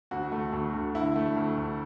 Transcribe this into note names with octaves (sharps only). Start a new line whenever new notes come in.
D2 F#4
A3
D2
D2
D3 E4
A3
D2
D2